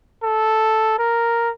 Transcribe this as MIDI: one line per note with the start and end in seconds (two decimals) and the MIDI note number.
0.23 0.98 69
0.99 1.50 70